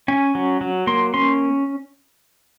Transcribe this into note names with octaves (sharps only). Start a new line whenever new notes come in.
C#4 G#5
F#3
F#3
A#3 C6
C#4 C6